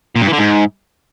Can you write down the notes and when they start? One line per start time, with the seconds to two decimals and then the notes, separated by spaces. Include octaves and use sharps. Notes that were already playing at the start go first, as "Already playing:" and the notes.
0.16 A#2
0.21 G2
0.27 E3
0.33 D3
0.39 G#2